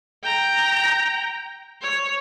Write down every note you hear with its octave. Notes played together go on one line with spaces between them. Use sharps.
G5 A#5
C#5